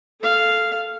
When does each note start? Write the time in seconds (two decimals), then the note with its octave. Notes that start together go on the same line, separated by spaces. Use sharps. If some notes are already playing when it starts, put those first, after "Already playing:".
0.20 A4 F5